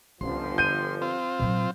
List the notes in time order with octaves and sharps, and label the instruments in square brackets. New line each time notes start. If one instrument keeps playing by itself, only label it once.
[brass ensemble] G1 F3 [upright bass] C#2 C#4 [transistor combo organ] C6
[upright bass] D3 [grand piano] G6 D#7
[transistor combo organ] C4 F4 C5
[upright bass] A#2 F#3